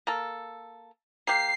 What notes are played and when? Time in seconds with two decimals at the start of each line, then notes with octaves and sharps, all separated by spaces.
0.07 A#3 A4
1.27 A#3 G4 C7